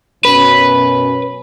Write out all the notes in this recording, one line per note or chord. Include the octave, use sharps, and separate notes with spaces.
F#2 B2 C#4 B4